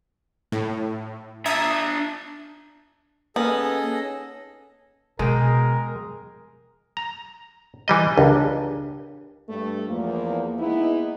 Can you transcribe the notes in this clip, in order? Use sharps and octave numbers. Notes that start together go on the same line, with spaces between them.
A2
D4 E5 A5 A#5 D#6 G#6
A#3 B3 C#4 D#4 G#4 A4 D#5
B2 G#3 G#4 A#4 G5
A#5
E3 G3 D#5
C#2 D4 G4 A#4
G2 A3
E2 F3 A#3
G#3 A#3 B3 D#4 E4